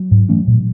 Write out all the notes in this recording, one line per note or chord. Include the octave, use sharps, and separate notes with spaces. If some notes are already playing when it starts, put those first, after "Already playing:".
Already playing: F#3
G#2
E3 A3 C#4
A#2